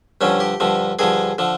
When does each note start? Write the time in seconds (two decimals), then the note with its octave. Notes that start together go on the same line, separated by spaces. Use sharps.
0.21 G2 D3 F3 C#4
0.40 G4
0.60 G2 D3 F3
0.99 G2 D3 F3 G#4
1.38 D3 F3